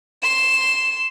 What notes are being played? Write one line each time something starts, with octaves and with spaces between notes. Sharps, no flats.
C6 E7